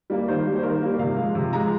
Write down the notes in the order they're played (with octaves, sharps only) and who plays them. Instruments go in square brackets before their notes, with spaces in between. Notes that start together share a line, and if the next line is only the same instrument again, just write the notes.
[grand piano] G3 A#3
D#3 C5
G3 A#3
C5
D#3 A#4
G3 A#3
C3 F5
F3 G#3
C3
F3 G#3 A#5